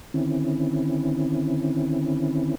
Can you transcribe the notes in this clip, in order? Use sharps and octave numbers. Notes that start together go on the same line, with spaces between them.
D3 D#3 C4 C#4 E4